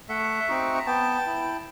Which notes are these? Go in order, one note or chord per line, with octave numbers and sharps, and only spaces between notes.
A3 E5 F#5
C4 D#4 F#4
A#5
B3 G5 A5
E4